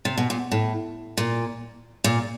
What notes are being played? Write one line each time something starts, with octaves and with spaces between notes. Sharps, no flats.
C3
B2
A#2
A2
A#2
A#2